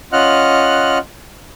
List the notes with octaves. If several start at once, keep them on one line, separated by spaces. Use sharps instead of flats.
C#4 F4 D#5 F#5 F6 F#6